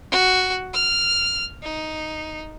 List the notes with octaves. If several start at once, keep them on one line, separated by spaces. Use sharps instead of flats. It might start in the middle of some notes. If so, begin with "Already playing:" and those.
F#4
F6
D#4